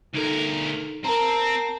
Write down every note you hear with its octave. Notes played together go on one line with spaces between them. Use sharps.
D2 D#4 A4 A#4
C4 A#4 A5 A#5